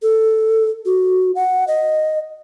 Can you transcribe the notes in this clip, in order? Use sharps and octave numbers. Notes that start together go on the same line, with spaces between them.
A4
F#4
F#5
D#5